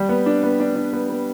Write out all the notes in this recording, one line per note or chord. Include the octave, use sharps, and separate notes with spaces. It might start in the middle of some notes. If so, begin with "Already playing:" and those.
Already playing: G3
B3
D4
B3
D4
D4
B3
B3